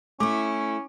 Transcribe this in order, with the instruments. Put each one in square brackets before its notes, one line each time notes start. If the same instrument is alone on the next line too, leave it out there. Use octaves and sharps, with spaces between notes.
[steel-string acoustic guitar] A3 E4 [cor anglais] C#4 [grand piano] D6